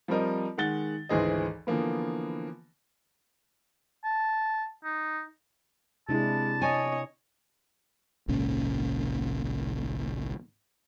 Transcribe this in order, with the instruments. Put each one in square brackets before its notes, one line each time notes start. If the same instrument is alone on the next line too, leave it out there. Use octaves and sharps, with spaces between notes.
[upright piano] F3 G3 C4 A#4 D#5
D#3 G#3 F#5 A6 G7
G#1 D2 E3 G#4 C5 D#5
D3 E3 F3 A#3 B3
[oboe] A5
D#4
[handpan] C3 D4 E4 [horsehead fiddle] G#3 [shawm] A5
[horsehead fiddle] C#5 D#5 [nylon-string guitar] G#5
[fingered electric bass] G#1 C#2 A#2 C#4